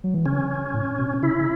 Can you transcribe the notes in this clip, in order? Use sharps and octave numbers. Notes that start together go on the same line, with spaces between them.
F#3
E3
C#3 C#4
A2
B2
C#3 E4
C#3